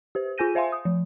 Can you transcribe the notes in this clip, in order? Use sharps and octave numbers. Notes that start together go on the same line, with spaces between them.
G4 C5
F4 G#4 G#5 G6 A#6 D#7
C5 E5 F5 G#5 C6
D#6
F3